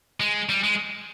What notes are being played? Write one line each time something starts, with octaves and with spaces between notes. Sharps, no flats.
G#3
G3
G#3